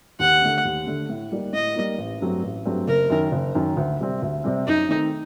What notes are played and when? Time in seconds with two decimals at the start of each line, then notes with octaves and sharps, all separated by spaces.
0.19 D#2 F#5
0.41 D3 A3
0.65 D#2
0.86 D3 A3
1.09 A2
1.32 G3 A#3 D#4
1.53 A2 D#5
1.76 G3 A#3 D#4
1.98 A1
2.21 G2 F#3 A3 C4
2.43 A1
2.65 G2 F#3 A3 C4
2.88 F#1 A#4
3.10 F#2 D#3
3.32 F#1
3.55 F#2 D#3
3.77 D2
4.00 C3 G3 C4
4.22 D2
4.44 C3 G3 C4
4.67 F#2 D#4
4.89 D#3 A3 C4